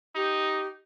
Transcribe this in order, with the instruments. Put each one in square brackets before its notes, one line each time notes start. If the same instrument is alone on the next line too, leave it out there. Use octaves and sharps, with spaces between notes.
[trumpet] D#4 [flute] G4